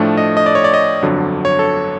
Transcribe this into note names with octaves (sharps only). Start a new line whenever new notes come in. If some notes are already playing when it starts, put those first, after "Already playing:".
Already playing: A2 F3 A3 D4
D#5
D#5
D5
C#5
D5
D#5
G1 F2 D3 F#3
C#5
A4